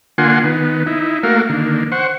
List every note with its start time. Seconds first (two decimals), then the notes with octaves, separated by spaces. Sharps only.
0.18 D3 A#3 F4 F#5 G#5 C6
0.44 D#3 B3
0.86 D#4 E4
1.23 A3 A#3 F#4 A#4 F5
1.50 D3 D#3 A#3
1.92 C5 F#5 C#6